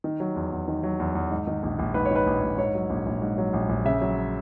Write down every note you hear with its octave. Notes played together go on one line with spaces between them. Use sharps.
D#3
F#3
E2
E2
D#3
F#3
E2
E2
G#2
D#3
A#1
A#1
G#2 B4
C#5
D#3 B4
A#1
A#1
G#2 C#5
F#3
A#1
A#1
G#2
F#3
A#1
A#1
C#3 E5
F#3